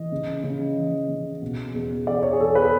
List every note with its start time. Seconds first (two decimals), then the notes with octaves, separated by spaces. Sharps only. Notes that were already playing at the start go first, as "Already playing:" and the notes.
Already playing: E3 D#5
0.12 C#3
0.44 C#3
0.77 E3
1.09 C#3
1.42 B2
1.74 E2
2.07 E2 D5
2.23 C#5
2.33 G#4
2.39 E2 A4
2.55 B4